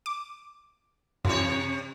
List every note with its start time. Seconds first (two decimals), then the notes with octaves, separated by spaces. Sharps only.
0.06 D6
1.25 F#2 C3 E3 C#5